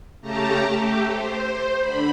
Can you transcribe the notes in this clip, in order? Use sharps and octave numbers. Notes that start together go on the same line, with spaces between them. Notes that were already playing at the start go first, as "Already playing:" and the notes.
C#3 A3 G4 A5 A#5
A3 G4
C5
D3 B5